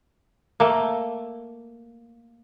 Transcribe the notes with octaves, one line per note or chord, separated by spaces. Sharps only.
A3 A#3